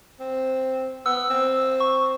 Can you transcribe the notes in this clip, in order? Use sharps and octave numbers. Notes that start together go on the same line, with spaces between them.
C4
B3 E6
C4
C#6